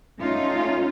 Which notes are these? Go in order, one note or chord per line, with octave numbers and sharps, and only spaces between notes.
A3 C#4 D#4 F4